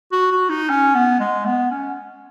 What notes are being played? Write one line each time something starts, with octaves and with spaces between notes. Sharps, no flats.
F#4
F#4
D#4
C#4
B3
G#3
B3
C#4